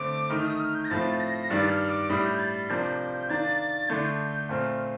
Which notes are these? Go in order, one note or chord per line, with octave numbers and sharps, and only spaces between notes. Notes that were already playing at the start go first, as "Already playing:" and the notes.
Already playing: D3 A3 C4 D6
D#3 A3 D#4 F6
D#6
F6
G6
A#6
A2 F3 A3 C4 A6
A#6
G2 D#3 G3 D4 A6
F6
D6
A2 G3 D4 D#6
G6
A6
A6
C3 F3 A#3 D4 G6
D#3 A#3 D4 A6
D3 A3 D4 G6
A6
G6
A#2 A3 C4 F6